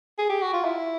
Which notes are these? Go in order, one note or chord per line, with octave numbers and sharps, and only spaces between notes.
G#4
G4
F#4
F4
E4